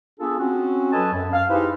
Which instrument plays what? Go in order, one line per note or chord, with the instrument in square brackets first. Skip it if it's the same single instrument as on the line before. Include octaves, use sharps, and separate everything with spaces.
[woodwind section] B3 D4 F4 G#4 A4
C4 C#4 F#4
F#3 A4 B4 D#5 G#5 A5
F#2
F5
D#4 E4 G4 G#4 B4 C5